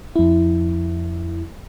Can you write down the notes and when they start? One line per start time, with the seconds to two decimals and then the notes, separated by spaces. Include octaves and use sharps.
0.16 F2 E4